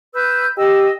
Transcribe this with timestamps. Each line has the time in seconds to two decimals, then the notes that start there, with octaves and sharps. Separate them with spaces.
0.14 B4 E6 G6
0.57 G4 D#5 E6